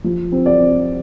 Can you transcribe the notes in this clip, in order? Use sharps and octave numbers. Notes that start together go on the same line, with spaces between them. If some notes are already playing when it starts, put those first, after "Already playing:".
F3
C4
D5
C4